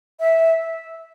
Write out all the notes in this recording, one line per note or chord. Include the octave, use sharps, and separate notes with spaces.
E5